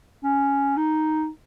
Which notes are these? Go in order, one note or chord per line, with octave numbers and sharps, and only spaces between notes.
C#4
D#4